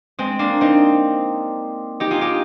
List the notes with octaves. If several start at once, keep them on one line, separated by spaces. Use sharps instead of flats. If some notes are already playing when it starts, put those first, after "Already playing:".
G#3 C4
A#3 D4
C4 D#4
D#4 G4
F4 G#4
D#4 G4